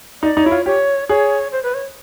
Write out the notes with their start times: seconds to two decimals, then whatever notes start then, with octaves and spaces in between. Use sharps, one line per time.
0.22 D#4 D5
0.37 D#4
0.44 E4 C#5
0.51 F4
0.65 G4 C#5
1.09 G#4 C#5
1.52 C5
1.63 B4
1.74 C#5